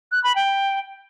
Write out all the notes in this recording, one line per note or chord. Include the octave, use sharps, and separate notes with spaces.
F#6
B5
G5